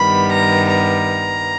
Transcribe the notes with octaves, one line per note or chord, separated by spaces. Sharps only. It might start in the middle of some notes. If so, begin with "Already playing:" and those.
Already playing: G2 D#3 G3 B3 B5
A#5
A#5